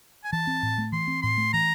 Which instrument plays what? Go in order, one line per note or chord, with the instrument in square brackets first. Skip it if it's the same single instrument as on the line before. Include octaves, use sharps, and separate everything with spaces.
[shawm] G#5
[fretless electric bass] E3 [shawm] A5
[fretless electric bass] C4
A2
A3
[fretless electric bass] E3 [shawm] C6
[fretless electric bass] C4
[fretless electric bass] A2 [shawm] C6
[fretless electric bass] A3
[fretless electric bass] E3 [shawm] A#5